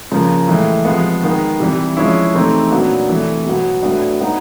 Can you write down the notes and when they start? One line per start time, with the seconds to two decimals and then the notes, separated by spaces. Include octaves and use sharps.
0.12 C#3 F3 A#3
0.48 A2 E3 G#3
0.85 C3 F3 G#3 B3
1.23 D#3 G#3 B3
1.60 C3 E3 G3
1.97 F3 G#3 C#4 E4
2.34 C3 E3 A3 C4 D#4
2.71 A#2 F#3 B3 D4
3.09 C3 E3 A3
3.45 B2 F#3 B3
3.82 A2 F#3 B3 D4
4.20 F#3 B3 D#4